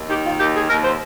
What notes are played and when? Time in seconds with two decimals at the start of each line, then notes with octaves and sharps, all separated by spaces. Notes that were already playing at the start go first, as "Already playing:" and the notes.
Already playing: D#2
0.08 D#3 G4
0.24 F4
0.39 D#2 G4
0.54 G#4
0.68 D#2 A#4
0.83 C5